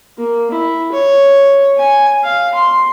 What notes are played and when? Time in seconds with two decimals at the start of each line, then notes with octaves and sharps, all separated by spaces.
0.18 A#3
0.51 E4
0.92 C#5
1.77 G#5
2.24 F5
2.54 C6